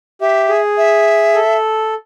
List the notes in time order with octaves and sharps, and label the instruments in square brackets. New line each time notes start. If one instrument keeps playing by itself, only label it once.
[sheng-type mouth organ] G4 [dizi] E5
[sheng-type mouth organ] G#4
[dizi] E5
[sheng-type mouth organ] A4